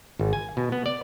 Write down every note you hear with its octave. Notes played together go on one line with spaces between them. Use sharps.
G#1
G#5
B2
B3
D5